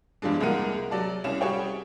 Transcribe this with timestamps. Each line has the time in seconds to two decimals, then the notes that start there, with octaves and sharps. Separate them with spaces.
0.22 E2 G2 F3 G#3 D4
0.40 C2 G#3 A#3 A#4 F#5 D#7
0.91 F#3 D5 A5
1.24 C2 C#4 E7
1.41 G3 F#4 G#4 C#5 G5